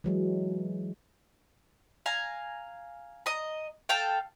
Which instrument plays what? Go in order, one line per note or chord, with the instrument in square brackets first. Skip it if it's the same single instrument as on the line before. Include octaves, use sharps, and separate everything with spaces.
[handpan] E3 F#3 G#3
[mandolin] F5 G#5 A#5
D#5 A#5
A4 F5 G5